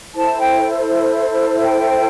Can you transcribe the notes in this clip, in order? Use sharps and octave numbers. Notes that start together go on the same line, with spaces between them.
E4 A4 C5 A5
G5
G5